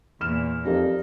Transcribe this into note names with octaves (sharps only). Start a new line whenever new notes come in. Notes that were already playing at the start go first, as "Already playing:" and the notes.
E2 A#2 F6 E7
F2 D#4 G4 A#4 D5